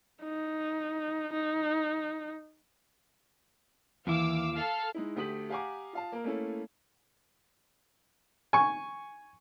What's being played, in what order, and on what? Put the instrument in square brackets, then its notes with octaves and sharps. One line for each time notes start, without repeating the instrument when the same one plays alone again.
[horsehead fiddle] D#4
D#4
[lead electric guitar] D#2 E4 [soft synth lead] E3 [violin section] F5 D6 E6
[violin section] A4 F5 [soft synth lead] F6
[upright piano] G#3 D#4 E4
D2 A3 G4 D#6 B6 F#7
G4 F5 F#5 G#5 A#5 D6
F4 F5 A5
A#3 A#4
A3 A#3 C#4 E4 A4
[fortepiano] G#5 C#6